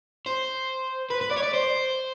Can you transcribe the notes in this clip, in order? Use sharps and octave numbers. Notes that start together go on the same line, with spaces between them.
C5
B4
B4
D5
C#5
D5
C5